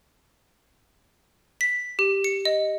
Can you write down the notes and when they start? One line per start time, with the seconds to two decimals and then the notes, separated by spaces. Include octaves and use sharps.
1.61 B6
1.99 G4
2.24 C#7
2.45 D#5